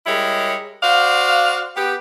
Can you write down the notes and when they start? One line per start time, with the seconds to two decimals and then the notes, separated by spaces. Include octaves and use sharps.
0.06 G3 G#3 E4 A#4 C#5
0.83 F#4 C5 D5 F5
1.76 B3 G4